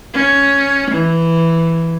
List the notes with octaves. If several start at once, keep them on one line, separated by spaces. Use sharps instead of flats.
C#4
E3